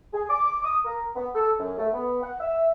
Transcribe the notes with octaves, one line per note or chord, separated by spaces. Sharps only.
G#4
D6
D#6
A#4
B3
A4
F#2
A3
B3
F#5
E5